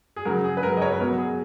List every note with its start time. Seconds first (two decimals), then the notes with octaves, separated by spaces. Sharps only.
0.16 G#4
0.25 C#3 F#3 A#4
0.44 G#4
0.57 B4
0.63 C#3 A#4
0.67 F#3
0.77 D#5
0.81 A#4 C#5
0.93 B4
1.00 B2 F#3 A#4
1.18 G#4